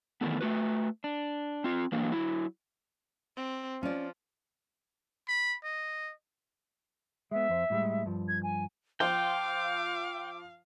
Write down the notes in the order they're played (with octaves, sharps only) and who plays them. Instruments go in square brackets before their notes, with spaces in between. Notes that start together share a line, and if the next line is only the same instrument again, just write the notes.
[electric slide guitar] D#3 E3 A3 B3
A3 F#4 B4
D4
C4 F4
E3 F#3 A#3 D4
F#3 E4
[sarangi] C4
[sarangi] F3 [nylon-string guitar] C#4 D5
[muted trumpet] B5
D#5
[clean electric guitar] G#3 B3 [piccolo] E5
[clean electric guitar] F2 C5
A2 G3 G#3
G2 F3
[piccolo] G#6
G#5
[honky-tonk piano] F3 F4 C5 [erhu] F5 [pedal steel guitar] G5 [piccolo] D6